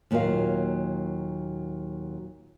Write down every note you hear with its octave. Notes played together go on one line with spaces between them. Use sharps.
D#2 A#2 F#3 A#4 F5